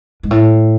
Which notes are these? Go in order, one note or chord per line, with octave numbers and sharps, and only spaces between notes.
G#2
A2